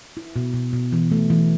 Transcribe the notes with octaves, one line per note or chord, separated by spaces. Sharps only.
E4
B2
B2
B2
E3
A3
E3